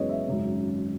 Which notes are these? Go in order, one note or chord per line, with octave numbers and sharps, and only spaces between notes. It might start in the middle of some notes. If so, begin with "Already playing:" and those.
Already playing: F#2 C#3 E3 G#3 B3 C#5 D#5
E5
G#1 F#2 C#3